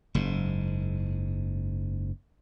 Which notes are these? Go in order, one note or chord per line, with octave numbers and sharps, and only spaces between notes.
F#1 G#2